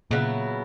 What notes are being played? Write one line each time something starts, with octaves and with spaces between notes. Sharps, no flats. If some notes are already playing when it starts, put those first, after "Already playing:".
A#2 C#3 F#3 B3 E4